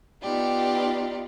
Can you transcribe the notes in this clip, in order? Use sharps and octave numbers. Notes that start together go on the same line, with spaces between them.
B3 D#4 F4 G4 D5